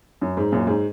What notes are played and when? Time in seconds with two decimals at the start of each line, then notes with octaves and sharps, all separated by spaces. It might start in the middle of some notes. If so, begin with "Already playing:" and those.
0.22 F#2
0.37 G#2
0.52 F#2 A#2
0.67 G#2